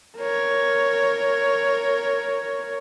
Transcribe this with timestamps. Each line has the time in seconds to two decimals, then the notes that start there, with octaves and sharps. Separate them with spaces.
0.18 A#4 C#5